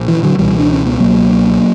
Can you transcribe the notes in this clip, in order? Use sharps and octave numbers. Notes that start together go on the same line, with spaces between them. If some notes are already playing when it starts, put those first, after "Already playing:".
Already playing: A#1
E3
D3 F#3
C#2 B2 E3 G3
D4
C#4
B3
C#2 B2 F#3 A#3